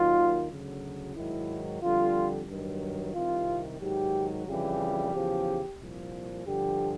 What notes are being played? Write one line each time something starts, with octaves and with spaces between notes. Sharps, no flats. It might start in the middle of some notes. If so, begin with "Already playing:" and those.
Already playing: D#2 D#3 F#3 F4
D2 C#3 F#3
G#2 D#3 F#3 E4
F2 D3 G3 F4
G2 D#3 F#3
C2 C3 D#3 F4
G#2 D#3 F#3 G4
F2 C#3 E3 G3 G4
E2 C#3 F3
C2 A#2 F3
G2 D3 F3 G4